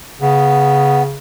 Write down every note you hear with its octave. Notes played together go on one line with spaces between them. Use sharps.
C#3 B3